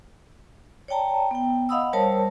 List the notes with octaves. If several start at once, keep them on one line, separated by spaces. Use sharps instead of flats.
C#5 D5 G5 A5 A#5
B3 G5
D#5 F5 F#5 B5 D#6 E6
G3 A#4 C5 C#5 A5